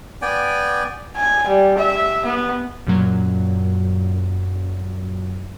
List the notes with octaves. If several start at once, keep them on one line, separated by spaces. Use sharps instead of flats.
B3 D5 G5 G#5
G#5
G3
E5
B3
F#2 A#2 F#3